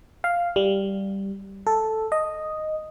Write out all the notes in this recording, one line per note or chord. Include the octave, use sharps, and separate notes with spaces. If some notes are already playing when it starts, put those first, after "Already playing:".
F5
G3
A4
D#5